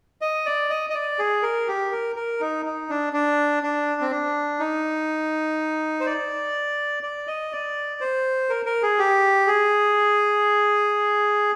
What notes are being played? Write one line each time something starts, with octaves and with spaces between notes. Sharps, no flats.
D#5
D5
D#5
D#5
D5
G#4
A#4
G4
A#4
A#4
D#4
D#4
D4
D4
D4
C4
D4
D#4
C5
D5
D5
D#5
D5
C5
A#4
A#4
G#4
G4
G#4